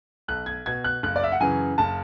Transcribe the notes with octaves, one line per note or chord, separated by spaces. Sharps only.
B1 F#6
G#6
B2 G#6
F#6
F#1 F#6
D5
E5
F#5
F#2 C#3 E3 G#5
F#1 A5